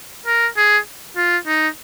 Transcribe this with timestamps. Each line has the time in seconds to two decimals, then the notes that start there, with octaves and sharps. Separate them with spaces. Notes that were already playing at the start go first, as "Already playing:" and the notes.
0.26 A#4
0.57 G#4
1.16 F4
1.47 D#4